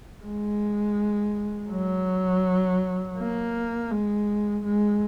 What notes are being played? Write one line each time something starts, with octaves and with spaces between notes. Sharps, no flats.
G#3
F#3
A#3
G#3
G#3